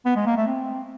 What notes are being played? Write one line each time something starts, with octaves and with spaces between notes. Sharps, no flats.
B3
G#3
A#3
A3
C4